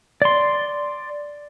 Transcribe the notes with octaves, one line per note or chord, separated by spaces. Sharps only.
D5 C6